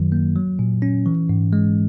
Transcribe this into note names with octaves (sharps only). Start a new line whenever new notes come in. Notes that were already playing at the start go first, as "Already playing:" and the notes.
Already playing: F#2 D#3 F#3
A#3
F#3
A#2
C#4
E3
G#2
G#3